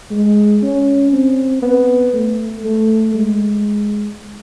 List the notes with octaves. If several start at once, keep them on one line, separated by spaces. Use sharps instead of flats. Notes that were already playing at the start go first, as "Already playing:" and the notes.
G#3
C#4
C4
B3
A3
A3
G#3